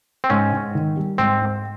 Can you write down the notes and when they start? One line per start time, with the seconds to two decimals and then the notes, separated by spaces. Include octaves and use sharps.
0.24 C4
0.30 G#2 C#4
0.53 G#2
0.75 D#3
0.97 G3
1.18 G#2 C4
1.41 G#2